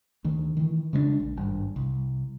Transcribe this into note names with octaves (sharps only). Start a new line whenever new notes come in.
D2 D#3
D#3 E3
C#3 G#3 B3 D4
A#1
G#1 G2
C2